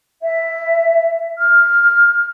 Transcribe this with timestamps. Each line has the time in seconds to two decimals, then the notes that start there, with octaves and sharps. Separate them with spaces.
0.21 E5
1.38 F6